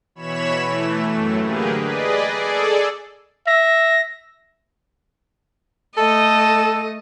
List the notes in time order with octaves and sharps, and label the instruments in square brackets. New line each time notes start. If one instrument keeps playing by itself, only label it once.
[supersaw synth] B2 E3 C#5 B5 E7
E3 A3
F#2 A2 F#3 A3
D3 A#3 G4 G#4 A#4 B4
G#4 B4 D5 D#5
G#4 A4 D5
[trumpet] E5 [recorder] A#6
[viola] A3 D#5 [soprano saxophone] A4